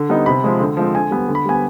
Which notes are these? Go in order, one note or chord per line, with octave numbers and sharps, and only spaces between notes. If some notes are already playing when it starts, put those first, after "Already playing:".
Already playing: D3
G3 B3 D#4
C3 B5
F3 G#3
D3
F3 G#3 C4
D3 G#5
G3 B3
D3
B5
G3 B3 G#5